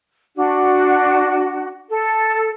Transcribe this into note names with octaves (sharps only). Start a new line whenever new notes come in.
D4 F#4
A4